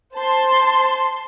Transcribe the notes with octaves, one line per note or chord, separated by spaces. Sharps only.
C5 A5 C6